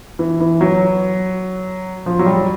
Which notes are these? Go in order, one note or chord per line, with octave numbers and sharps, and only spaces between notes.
E3
E3
F#3
F3
F#3
G3